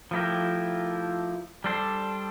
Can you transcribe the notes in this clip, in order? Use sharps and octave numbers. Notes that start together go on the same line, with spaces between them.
F3 A3 E4 G4 A#4
G3 D4 A4 C5